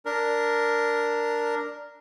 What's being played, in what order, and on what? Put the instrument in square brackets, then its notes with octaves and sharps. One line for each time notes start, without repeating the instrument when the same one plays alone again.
[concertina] D4 A#4